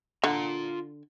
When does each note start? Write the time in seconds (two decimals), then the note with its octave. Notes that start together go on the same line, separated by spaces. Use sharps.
0.24 D3 F4 A#5